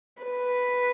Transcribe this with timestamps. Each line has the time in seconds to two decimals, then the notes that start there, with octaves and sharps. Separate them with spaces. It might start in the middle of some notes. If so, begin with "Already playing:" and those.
0.22 B4